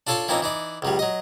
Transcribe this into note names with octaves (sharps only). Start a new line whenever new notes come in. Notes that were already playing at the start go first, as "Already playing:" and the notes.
D4 F4 A4 C#5 A5 C6
E3 F3 A#3 C4 C#4 D#4
E3 D#4 D5
C#2 F#3 G3
F#3 D#5